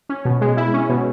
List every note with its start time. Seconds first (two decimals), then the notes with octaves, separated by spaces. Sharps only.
0.09 C#4
0.25 B2
0.41 G#3
0.57 E4
0.74 C#4
0.89 B2